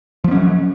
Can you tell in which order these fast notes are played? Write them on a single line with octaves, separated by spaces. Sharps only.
F3 B3 C#4 F#3